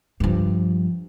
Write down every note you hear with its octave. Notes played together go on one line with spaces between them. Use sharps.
G2 F3